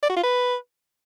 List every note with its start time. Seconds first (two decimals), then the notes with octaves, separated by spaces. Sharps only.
0.02 D5
0.09 F#4
0.16 F4
0.23 B4